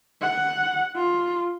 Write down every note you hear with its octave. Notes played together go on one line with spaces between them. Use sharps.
F#5
F4